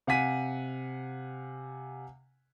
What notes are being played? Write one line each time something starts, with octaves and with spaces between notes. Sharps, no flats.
C3 F5 F#5 G#5 B6 D#7